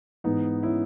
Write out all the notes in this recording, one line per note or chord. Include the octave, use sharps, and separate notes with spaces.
G#2 E3 B3 D#4
C#4 E4